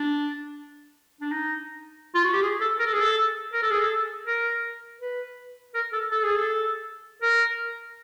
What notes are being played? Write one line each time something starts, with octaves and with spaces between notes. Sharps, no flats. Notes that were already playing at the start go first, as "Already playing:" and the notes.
Already playing: D4
D4
D#4
F4
F#4
G4
G#4
A4
A#4
A4
G#4
A4
A#4
A4
G#4
A4
A#4
B4
A#4
A4
A4
G#4
A4
A#4